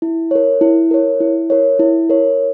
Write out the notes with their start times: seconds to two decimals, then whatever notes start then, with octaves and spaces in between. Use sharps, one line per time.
0.02 E4
0.31 A#4 C#5
0.61 E4
0.91 A#4 C#5
1.20 E4
1.50 A#4 C#5
1.79 E4
2.10 A#4 C#5